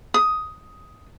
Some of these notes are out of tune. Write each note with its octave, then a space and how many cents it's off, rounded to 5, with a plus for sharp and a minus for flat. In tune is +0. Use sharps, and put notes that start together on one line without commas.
D#6 +10